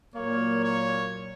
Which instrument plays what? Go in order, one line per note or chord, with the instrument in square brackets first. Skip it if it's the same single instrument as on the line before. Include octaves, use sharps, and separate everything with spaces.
[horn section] A#2 F#3 A#3 [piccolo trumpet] C#5
[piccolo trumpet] C#5